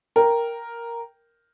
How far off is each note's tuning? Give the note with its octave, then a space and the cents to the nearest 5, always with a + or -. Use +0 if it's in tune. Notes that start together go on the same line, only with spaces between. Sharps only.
A#4 +0 G5 +0